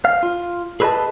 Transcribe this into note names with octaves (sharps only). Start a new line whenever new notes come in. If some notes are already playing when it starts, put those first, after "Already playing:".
F5
F4
G#4 A4 B4 C5 D#5 A5